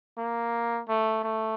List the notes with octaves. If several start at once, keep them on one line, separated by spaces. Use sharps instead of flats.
A#3
A3
A3